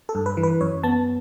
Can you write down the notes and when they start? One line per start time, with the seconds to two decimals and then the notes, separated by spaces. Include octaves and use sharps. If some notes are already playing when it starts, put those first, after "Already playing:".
0.09 A4
0.15 G2
0.26 B4
0.37 E3
0.43 B4
0.61 F#2 C#5
0.83 B3 A5